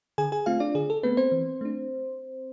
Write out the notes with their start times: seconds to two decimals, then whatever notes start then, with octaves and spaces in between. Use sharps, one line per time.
0.18 D3 G#4 G#5
0.32 G#4 G#5
0.46 A3 C4 F4 F5
0.60 D4 D5
0.75 D3 G#4
0.90 A4
1.03 A3 B3 C4 B4
1.17 C4 C5
1.32 E3
1.61 A3 D4